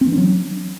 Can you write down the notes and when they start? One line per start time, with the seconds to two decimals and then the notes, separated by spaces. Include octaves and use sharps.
0.01 C4
0.07 E3
0.12 D4
0.18 F#3